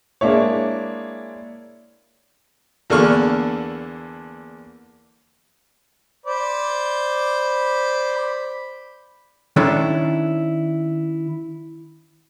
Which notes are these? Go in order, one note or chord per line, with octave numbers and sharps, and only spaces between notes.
G#3 A#3 D4 E4 C#5
E2 D3 A#3 A4 C#6 F6
C5 D5 B5
D#3 C#4 D4 E4 A4 C#5